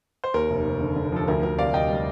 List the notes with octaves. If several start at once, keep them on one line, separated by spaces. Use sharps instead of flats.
C5
D#2 A#4
F1
F1
D3
D3
F3 A4
D2 A#4
D2 A#4
C3 D5 F5
D2 D#5 G5
G3